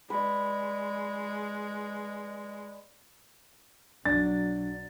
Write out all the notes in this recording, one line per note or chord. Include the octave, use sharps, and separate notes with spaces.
G#3 B4 D5
B1 F#3 D4 A6